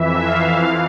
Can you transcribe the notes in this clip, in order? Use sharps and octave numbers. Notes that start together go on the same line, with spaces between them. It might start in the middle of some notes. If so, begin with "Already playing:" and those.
Already playing: F2 E3 E5
F5
F2 E3